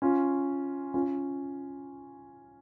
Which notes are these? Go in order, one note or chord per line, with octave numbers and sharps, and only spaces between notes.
C#4 F4
C#4 F4